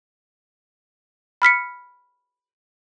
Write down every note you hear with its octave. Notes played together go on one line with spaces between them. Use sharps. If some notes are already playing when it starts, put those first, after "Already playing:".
B5 F6 B6 C#7